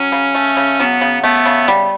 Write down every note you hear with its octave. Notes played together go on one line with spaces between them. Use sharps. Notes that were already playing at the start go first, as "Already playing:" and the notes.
Already playing: F#3 C#4
C#3
A3
C#3
F#3 B3
C#3
A3 B3
C#3
G3